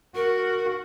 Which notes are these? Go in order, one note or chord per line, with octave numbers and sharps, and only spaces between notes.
F#4 A#4